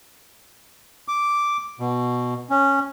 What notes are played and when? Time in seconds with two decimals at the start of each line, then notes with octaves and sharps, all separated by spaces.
1.08 D6
1.80 B2
2.50 C#4